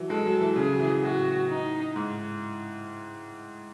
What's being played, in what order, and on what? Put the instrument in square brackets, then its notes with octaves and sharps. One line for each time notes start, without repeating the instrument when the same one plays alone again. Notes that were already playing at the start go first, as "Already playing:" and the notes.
Already playing: [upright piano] E3 F#3
[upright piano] G#3 [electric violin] A4
[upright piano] F#3
E3
[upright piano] C#3 [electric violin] G#4
[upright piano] F#3
E3
[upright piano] A2 [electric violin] F#4
[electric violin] D#4
[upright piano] G#2